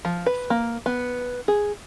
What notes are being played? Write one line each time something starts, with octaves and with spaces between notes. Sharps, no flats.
F3
B4
A#3
B3
G#4